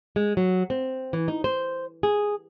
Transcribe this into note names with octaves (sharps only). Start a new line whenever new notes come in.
G#3
F#3
C4
E3
D#4
C5
G#4